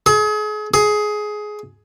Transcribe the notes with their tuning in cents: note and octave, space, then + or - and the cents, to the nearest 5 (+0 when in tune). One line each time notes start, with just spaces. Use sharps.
G#4 +35
G#4 +15